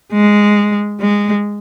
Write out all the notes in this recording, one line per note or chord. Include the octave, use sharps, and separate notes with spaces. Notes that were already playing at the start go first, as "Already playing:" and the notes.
G#3
G#3